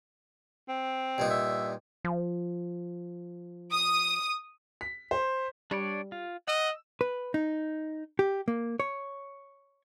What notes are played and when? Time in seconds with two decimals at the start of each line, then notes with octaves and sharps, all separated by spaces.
0.69 C4
1.18 G2 A#2 D#4
1.30 E5
2.05 F3
3.73 D#6
4.81 B6
5.11 C5
5.71 G3 D4 C#5 D5
6.12 F4
6.48 D#5 F#5 E6
7.01 B4
7.34 D#4
8.19 G4
8.48 A#3
8.80 C#5